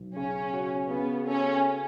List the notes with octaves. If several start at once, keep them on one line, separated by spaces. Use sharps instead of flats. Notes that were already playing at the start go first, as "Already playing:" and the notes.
Already playing: B1
C#3 C#4
F#4
C#3 B3
C#4 A4